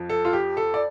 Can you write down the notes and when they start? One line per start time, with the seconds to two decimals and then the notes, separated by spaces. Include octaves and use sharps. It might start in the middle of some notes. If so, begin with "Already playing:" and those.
Already playing: F2 F3
0.09 A4
0.25 F4
0.33 G4
0.57 A4
0.74 D5